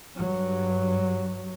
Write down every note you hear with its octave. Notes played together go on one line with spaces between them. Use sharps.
G2 F#3